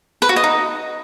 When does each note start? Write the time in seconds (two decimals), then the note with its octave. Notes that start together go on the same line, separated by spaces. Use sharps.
0.22 B4
0.29 F#4
0.36 D#5
0.44 D#4